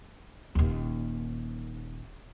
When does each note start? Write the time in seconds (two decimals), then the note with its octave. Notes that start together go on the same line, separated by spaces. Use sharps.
0.55 D#1 D#2